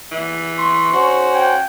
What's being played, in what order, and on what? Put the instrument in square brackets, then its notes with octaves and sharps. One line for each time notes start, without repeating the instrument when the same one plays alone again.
[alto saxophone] E3
[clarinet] C6 [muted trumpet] C#6
[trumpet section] C#4 C5 [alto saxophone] F#4
[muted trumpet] G5 [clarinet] G#5